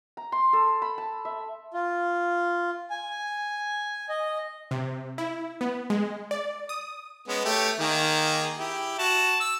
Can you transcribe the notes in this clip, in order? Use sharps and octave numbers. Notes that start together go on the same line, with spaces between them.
A#5
C6
A4
B5
A5
E5
F4
G#5
D#5
C3
E4
B3
G#3
D5
D#6
G#3 B3 C#4
A3 G4 C#5
D#3 A#3 G#4
E4 G4
F#4 A5
E6